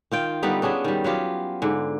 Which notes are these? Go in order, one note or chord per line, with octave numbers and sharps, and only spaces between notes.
D#3 F4 G5
D3 G3 B3 D#4
B3 C#4 D4 G#4
D#3 G3
F#3 B3 F4 G4
G#2 D3